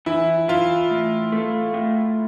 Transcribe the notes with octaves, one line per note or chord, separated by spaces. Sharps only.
E3 E4
E3 F4
A2
A3
A2